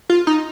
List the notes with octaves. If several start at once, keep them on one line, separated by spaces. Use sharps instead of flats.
F4
D#4